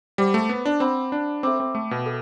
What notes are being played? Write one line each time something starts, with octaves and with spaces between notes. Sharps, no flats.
G3 C5 F#5 B5 D6
A3
B3
D4
C4 C5 F#5 B5 D6
D4
C4 A4 E5 G5 B5 D6
C4
A3
B2
A4